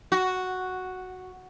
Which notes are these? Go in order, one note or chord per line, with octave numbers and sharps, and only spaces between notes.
F#4